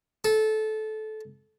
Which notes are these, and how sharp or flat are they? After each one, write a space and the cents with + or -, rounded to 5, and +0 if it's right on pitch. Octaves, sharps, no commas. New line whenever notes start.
A4 -20